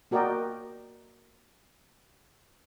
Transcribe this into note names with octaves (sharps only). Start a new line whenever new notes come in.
A#3 F#4 A#4 D5 D#5 G5